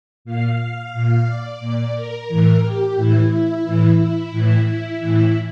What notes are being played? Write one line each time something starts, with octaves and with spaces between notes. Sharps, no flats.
A#2 F5
A#2
D5
A#2
A#4
A2 E3
G4
A2 E3 E4
E4
A2 E3
E4
A2 E3
E4
A2 E3